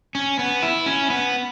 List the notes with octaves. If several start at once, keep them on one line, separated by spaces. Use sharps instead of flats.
C#4
B3
E4
C#4
B3